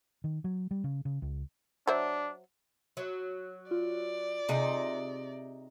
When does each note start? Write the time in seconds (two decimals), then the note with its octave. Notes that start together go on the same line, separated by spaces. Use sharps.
0.24 D#3
0.44 F#3
0.71 G3
0.84 C#3
1.05 C#3
1.22 C#2
1.87 F#3 D4 C5 E5
2.97 F#3
3.71 F4 D5
4.49 C3 D#4 G#4